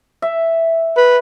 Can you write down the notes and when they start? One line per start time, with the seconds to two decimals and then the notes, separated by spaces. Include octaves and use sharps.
0.22 E5
0.97 B4